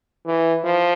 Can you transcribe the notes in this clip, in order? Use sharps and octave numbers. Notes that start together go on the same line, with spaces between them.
E3
F3